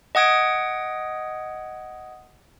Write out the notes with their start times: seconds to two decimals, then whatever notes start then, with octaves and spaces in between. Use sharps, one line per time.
0.15 D#5 F#5 D#6 G#6 D7